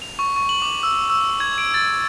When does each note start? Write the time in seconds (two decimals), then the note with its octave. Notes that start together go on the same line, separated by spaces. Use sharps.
0.02 F7
0.19 C#6
0.36 C#6
0.49 F#7
0.62 D6
0.83 E6
1.10 E6
1.40 G#6
1.58 D7
1.74 A6